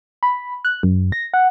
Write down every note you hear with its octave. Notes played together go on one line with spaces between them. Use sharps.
B5
F#6
F#2
A#6
F#5